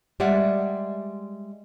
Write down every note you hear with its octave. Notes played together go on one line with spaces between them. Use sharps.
G3 G#3 D5 E5 F#5